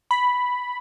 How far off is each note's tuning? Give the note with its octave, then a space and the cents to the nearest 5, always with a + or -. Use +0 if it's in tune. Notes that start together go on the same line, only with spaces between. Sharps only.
B5 +0